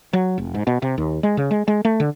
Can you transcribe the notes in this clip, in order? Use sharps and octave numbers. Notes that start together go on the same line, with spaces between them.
F#3
F1
G#2
B2
C3
D#2
G#3
C#3
G#3
G#3
A3
D3